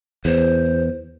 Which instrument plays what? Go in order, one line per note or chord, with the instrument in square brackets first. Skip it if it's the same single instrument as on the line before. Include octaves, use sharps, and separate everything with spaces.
[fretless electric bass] E2 [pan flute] C5